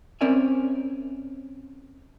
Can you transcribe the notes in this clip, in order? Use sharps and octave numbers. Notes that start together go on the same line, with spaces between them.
C4 C#4 A#4 D5 E5 G#5